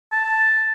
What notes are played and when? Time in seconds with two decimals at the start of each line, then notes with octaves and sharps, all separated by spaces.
0.12 A5